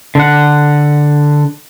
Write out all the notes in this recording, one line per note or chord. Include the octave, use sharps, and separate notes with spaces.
D3 F#5